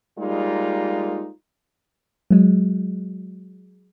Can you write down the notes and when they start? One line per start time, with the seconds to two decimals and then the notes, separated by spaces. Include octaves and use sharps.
0.18 G3 G#3 A#3 D#4 F4
2.31 F#3 G#3